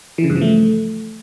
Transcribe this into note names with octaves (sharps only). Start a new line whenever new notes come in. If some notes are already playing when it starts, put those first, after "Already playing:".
E3
C#3
G2
F3
A3